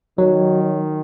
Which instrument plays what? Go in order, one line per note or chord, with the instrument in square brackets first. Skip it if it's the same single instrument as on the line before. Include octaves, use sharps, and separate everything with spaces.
[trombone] D#3 [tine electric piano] F#3